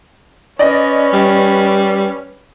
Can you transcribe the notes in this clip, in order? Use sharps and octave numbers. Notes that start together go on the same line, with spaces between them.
C#4 B4 D5 D#5
G3